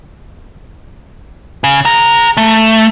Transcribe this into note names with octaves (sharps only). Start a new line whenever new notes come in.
C#3
G#4 A#5
A3